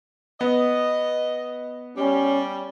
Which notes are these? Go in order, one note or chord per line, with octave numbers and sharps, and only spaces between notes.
B3 D#5
G3 C#4